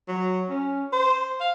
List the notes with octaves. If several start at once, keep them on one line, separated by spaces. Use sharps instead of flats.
F#3
C#4
C5
F5